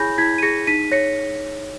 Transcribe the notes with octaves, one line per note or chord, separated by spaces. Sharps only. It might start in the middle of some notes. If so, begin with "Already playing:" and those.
Already playing: E4 G#4 C#5 G#5 B5 G6 A#6
E4 G#6 B6
D#7
G#4 A#6 C#7
D#4 B6 D#7
C#5 A#6 C#7